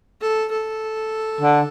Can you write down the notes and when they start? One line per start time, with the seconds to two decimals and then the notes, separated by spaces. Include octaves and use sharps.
0.21 A4
0.51 A4
1.41 D3